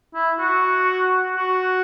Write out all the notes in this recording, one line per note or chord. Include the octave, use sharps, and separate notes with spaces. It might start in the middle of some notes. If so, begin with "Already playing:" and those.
E4
F#4
F#4